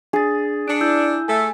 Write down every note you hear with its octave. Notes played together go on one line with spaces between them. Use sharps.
D4 G#4 A6
D4 C#7 D7
E4 E6 G6
A3 A4 G#5